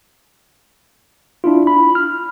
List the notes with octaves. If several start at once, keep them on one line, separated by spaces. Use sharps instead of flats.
D4 E4 F4
B5
F6